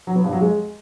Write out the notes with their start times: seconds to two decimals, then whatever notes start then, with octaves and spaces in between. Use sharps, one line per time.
0.07 F#3
0.16 B3
0.24 G2
0.33 F#3
0.41 G#3